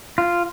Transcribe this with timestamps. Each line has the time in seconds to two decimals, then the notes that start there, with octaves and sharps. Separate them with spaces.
0.18 F4